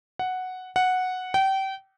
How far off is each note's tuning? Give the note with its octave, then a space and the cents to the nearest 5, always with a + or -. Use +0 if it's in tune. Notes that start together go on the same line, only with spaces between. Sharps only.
F#5 +0
F#5 -5
G5 -30